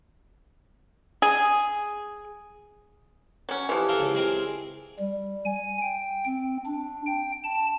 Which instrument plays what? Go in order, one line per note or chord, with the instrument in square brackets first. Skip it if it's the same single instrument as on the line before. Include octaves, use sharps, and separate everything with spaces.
[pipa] G#4
F#3 C#4
[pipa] E3 F3 [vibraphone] E4 G4
[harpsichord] A4 A#4 F5
C#2
G#3 C4 A#4
[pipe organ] G3
G#5
G5
C4
D4
G5
A5